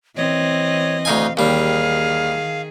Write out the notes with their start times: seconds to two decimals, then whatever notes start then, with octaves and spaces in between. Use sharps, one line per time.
0.17 E3 C4 C#5 D#5
1.05 D2 D#4 F5 G#5
1.37 D#2 D#3 G3 G#4 F5